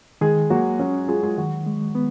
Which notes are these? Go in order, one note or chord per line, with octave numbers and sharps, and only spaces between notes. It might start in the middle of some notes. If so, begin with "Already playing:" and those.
D#3 G#3 G#4
F#3 A#3 F#4
F#3 C#4 F#4
G#3 F4 G#4
G#3 G#4
D#3 F#3 F#4
G#3
B3